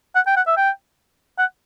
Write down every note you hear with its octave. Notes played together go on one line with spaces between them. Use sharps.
F#5
G5
F#5
E5
G5
F#5